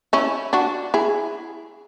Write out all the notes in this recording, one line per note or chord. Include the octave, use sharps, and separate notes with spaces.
C#4 E4
D4 F#4
E4 G#4